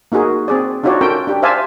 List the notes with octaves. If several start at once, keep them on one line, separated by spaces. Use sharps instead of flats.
A#3 D#4 F#4 G#4 A#4
C4 G#4 D5
D4 D#4 F4 F#4 C#5 D5
C#4 A4 A#4 G5
D4 G4
C5 D5 E5 F5 G#5 A5